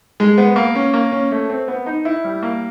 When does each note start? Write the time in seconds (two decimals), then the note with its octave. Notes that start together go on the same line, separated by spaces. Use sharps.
0.20 G#3
0.38 B3
0.56 A#3
0.75 C#4
0.93 A#3
1.12 C#4
1.32 A3
1.50 C4
1.68 B3
1.86 D#4
2.05 E4
2.24 G3
2.43 A#3